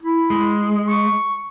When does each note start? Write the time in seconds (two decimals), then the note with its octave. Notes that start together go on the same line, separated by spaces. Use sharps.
0.03 E4
0.30 G#3
0.88 C#6